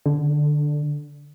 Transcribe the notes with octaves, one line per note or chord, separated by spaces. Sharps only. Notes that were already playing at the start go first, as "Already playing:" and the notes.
D3